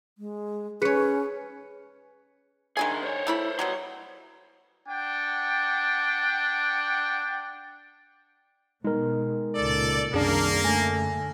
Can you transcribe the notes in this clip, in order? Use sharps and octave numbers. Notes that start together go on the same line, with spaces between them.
G#3
C#4 G#4 B4 C#5 C#7
D#3 G#3 D4 G#4 G#5
C5 C#5
A3 E4 B5
F#3 G3 B3 C#5 C6
D4 F#5 G5
B2 G#3 D#4 A#4
C#2 A#2 A4 D5
C2 F#2 D#3 A#3 D4 G#4
D3 A3 G#5 A#6